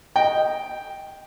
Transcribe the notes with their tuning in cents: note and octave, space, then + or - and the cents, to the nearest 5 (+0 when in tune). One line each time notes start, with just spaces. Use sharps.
D#5 +0 G5 +0